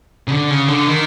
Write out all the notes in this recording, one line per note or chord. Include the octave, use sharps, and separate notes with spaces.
C#3
D3
C#3
D3
D#3